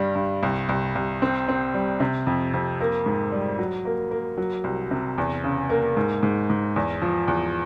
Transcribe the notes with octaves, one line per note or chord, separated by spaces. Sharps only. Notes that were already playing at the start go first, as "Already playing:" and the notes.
Already playing: G2 G3
G2
C2
C2
C2
C4
C4
G3
C3
F2
F2
A#3
G#2
G3
F#3
A#3
A#3
F#3
C2
C3
E2
C#3
A#3
G#2
G#2
G#2
E2
F3
E2